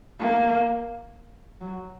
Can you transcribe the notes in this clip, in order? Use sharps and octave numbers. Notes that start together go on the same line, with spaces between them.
A#3
F#3